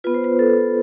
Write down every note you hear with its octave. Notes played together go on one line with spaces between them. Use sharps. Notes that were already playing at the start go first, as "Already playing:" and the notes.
B3 F4 B4
C5
B4
A4